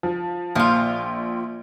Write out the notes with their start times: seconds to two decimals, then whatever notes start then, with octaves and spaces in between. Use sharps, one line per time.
0.03 F3
0.55 A#1 F3 F4